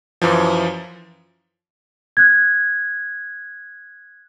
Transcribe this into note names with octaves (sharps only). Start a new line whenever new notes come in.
F#2 E3 F3
F#6 G#6